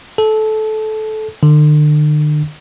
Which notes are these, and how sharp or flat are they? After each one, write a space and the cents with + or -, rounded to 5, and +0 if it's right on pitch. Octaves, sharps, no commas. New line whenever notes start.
A4 -20
D3 +40